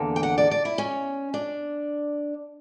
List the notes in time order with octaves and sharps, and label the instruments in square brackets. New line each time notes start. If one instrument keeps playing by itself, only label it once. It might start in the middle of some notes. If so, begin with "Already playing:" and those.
Already playing: [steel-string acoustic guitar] E2 D3 A#3
G5
F#5
D5
D5
E4
C#4
D4